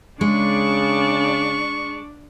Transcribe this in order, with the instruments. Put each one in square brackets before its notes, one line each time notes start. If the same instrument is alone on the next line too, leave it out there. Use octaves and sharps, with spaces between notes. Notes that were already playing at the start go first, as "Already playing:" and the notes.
[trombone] C#3 [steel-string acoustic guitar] G#3 [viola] D4 D5 [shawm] C#6